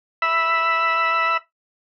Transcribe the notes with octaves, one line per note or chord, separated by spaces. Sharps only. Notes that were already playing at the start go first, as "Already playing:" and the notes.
E5 B5 E6